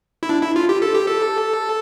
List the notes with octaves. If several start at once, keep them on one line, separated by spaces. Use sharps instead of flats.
E4
D4
E4
F4
G4
A4
G4
A4